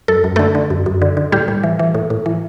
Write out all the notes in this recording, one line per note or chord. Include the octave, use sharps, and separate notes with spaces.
F#2 A4
F#2
D3 A3 A4
D3
F#2
F#2
D3
D3
A2 G3 G4
A2
E3
E3
A2
A2
E3